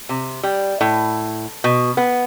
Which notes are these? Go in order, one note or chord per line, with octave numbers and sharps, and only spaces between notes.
C3
G3
A2
B2
B3